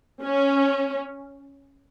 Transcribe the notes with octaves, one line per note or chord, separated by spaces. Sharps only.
C#4